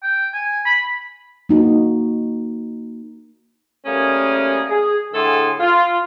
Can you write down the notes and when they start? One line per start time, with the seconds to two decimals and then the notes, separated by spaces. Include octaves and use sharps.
0.04 G5
0.34 G#5
0.66 B5
1.49 A#3 D#4 F#4
3.86 G3 A3 A#3 C#4 G#4 A#4
4.69 G#4
5.13 A2 D3 G#4 A4 G#5 C6
5.60 F4